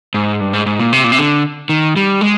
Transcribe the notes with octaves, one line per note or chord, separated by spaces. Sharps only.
G#2
G2
G#2
G#2
A#2
C3
A#2
C3
D3
D#3
G3
G#3